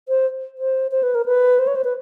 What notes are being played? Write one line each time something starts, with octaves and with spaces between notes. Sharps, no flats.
C5
C5
C5
B4
A#4
B4
C5
C#5
C5
B4